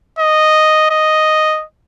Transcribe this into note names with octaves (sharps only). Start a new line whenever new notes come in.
D#5
D#5